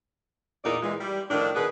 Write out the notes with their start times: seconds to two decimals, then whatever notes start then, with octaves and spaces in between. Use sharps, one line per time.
0.63 E2 A#2 D#4 D5
0.82 A#2 E3 G#3
0.99 G3
1.30 A2 D#3 F3 D4
1.55 B2 D#3 B3 G#4 B4